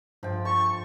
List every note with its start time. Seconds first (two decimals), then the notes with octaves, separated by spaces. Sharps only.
0.23 G2 F3 G5
0.45 A5 C#6